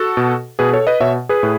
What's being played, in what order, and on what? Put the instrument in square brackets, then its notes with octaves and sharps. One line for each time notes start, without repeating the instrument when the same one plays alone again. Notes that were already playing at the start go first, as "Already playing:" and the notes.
Already playing: [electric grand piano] F#4 A4
B2
B2 G#4 B4
A4 C#5
B4 D#5
B2 C#5 E5
G#4 B4
A2